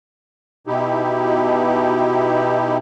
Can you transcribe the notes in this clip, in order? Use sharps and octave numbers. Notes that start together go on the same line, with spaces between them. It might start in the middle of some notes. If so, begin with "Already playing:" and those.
B2 D#4 E4 G4